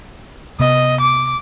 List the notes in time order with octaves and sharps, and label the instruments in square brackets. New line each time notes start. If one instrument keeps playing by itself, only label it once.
[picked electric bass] C3 B3 [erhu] D#5
[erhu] D6